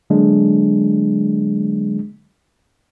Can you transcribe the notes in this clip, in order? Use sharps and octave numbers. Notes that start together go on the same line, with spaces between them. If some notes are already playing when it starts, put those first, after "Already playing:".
D3 F#3 G#3 A#3 D4